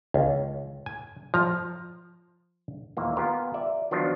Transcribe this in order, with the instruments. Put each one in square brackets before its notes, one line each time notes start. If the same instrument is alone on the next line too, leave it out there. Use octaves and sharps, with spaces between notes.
[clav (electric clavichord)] C#2
G#5
F3 A#5
D#2 A#2 E3 A#3
B3 F4 G4 A#4 G#5
D5 E5
D#3 F3 F#3 B3 D4 F4